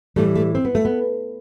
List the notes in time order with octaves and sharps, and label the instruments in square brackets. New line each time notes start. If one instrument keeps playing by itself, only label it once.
[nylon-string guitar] A2 E3 G3 A3
A3
C4
B3
A3
B3